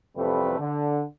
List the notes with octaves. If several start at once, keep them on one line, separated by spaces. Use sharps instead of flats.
A1 F2 C3 G3 A3 B4
D3